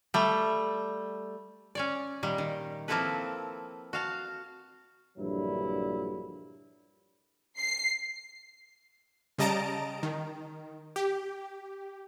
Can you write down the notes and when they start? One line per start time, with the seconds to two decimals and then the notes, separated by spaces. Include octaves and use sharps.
0.14 G3 A3
1.75 C#4 C#5 D5
2.23 A#2 D#3 G3
2.38 D#3
2.88 F3 A#3 C4 E4 A4 B4
3.93 F#4 F5 A5
5.18 A#1 G2 D3 F#3 E4
7.58 C7
9.38 C#3 G3 D#5 A5 A#5 D7
10.03 D#3
10.96 G4